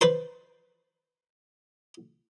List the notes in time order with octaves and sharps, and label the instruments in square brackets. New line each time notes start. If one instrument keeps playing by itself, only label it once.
[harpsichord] B4 C5 C6